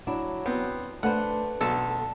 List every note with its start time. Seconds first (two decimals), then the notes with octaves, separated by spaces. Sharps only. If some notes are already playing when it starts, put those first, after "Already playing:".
0.07 F#3 D4 E4
0.46 B3 C4
1.03 A3 D4 B4 C5 F#5
1.61 B1 D3 A4